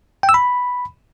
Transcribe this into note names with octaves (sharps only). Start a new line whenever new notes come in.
G5
E6
B5